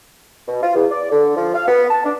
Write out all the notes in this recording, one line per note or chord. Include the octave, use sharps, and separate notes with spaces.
B2
F4
E2
D5
D3
F3
F5
B3
A5
D4